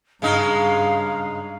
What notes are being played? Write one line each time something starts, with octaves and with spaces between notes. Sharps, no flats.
G2 C#3 G#3 D#4 F5